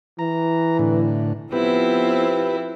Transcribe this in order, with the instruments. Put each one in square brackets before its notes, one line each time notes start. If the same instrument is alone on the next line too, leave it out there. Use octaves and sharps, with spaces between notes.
[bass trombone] E3 [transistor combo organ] A#5
[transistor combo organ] A2 D3
[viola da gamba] F3 C4 E4 [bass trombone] B3 [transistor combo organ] G4 B4